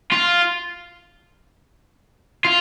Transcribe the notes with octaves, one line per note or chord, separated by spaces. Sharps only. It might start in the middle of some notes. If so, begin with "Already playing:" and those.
F4
F4